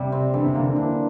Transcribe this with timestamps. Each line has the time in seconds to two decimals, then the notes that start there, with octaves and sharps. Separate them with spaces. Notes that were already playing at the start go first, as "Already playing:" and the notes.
Already playing: C3 G3 E4
0.12 C4
0.34 D3 E3
0.44 C3
0.55 D3 A#3
0.65 D3
0.76 E3 D4